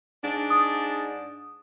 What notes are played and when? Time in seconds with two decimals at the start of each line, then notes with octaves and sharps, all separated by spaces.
0.22 G#2 D4
0.50 D#6